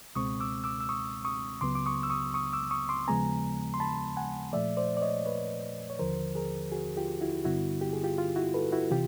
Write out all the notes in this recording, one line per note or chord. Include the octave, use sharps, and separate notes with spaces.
C#2 B2 G#3 C4 C#6 D#6
D6 E6
D6 E6
E6
C#6 D#6
C#6 D#6
C#2 C#3 F#3 B3 C6 D6
D6
C#6 D#6
E6
C#6 D#6
C#6 D#6
D6 E6
C#6 D#6
C6 D6
D#2 C#3 F3 G#3 B3 G#5 A#5
C6
A5 B5
F#5 G#5
A#2 F3 A3 D5 E5
C5 D5
D5
C#5 D#5
B4 C#5
C#5
D#2 D3 F3 A#4 C5
G#4 A#4
F#4 G#4
F4 G4
E4 F#4
G2 D3 G3 B3 E4 F#4
G4
G#4
F4 G4
F4
E4 F#4
A4 B4
E4 F#4
C3 E3 F4 G4